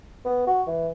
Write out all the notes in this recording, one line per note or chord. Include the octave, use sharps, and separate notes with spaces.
B3
F#4
E3